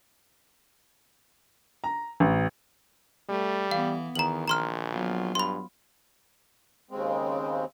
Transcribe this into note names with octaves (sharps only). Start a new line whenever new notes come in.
A#5
A1
G3 A3
E3 B3 F5
E2 D#3 A#5 F#7
A#1 A#5 C6 F6
F#3 B3 F4
G2 B5 C6
D#2 C#3 G#3 C4